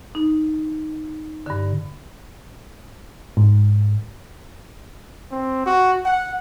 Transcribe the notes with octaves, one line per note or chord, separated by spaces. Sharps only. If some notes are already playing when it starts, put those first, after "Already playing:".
D#4
G2 D3
G#2
C4
F#4
F#5